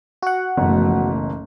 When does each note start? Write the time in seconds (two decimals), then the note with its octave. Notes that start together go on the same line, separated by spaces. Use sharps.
0.22 F#4 F#5
0.57 F#1 B1 F#2 E3 F3 A3